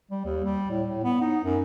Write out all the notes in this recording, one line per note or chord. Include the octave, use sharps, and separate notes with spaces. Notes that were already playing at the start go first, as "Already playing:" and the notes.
G3
D#2
G3
A2
A2
B3
D#4
F#2